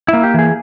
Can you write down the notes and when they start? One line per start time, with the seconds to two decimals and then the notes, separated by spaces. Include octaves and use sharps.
0.08 A#3 E4
0.23 G4
0.34 E3 G#4